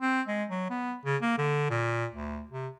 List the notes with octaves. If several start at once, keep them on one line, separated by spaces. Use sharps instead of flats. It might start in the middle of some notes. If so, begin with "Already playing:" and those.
C4
G#3
F#3
B3
C#3
A#3
D3
A#2
D2
C3